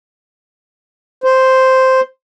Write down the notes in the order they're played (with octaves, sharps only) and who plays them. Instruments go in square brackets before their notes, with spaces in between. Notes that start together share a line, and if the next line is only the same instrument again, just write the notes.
[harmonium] C5